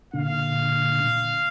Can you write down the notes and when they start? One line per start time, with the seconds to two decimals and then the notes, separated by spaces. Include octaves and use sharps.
0.13 A#2 D3 F5